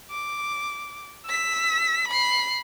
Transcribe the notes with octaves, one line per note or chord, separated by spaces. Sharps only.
D6
E6 B6
B5 C7